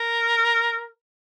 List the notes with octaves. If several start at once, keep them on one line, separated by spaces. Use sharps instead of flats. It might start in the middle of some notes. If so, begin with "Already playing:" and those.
Already playing: A#4